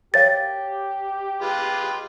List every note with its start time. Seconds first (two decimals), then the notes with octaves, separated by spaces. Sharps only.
0.14 G4 A#4 C#5 F5 A6
1.42 G#3 F4 B4